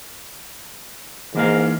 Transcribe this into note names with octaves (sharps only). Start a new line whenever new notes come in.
G#2 E3 A#3 F5